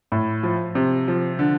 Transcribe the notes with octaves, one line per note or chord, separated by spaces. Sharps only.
A2
F3
C3
F3
D3